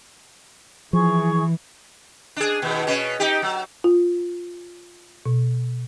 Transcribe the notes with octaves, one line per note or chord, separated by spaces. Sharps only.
E3 F3 G#4 C#6
D4 G#4
D#2 B2
B2 C#4
D#4 G4
F#3
F4
B2